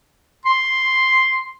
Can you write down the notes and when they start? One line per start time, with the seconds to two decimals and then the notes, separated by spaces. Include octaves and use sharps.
0.46 C6